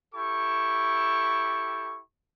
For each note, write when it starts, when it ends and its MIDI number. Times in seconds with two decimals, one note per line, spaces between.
0.15 1.99 64
0.15 1.99 67
0.15 1.99 69
0.15 1.99 85